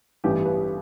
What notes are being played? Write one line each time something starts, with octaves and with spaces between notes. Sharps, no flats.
A1 G2 E3 G3 B3 G4
B4